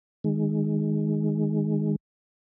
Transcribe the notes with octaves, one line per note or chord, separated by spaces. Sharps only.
D#3 G#3